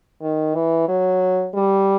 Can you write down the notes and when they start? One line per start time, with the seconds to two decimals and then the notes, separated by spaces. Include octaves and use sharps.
0.22 D#3
0.55 E3
0.88 F#3
1.54 G3